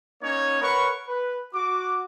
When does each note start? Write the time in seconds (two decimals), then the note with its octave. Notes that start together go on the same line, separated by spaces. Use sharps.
0.22 A#3 C#4 D#4 C#5
0.62 A#4 B4 C#5 F#5 B5 C#6
1.08 B4
1.54 F#4 D6